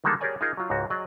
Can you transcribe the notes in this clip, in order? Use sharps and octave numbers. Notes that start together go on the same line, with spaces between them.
D3 D#3 G3 G#3 A#3 A4
G4 G#4 A#4 C#5 D5 G#5
D#4 F4 G#4 A#4
F#3 F4
C#2 G#2 F#4
F#3 G#4 D5 D#5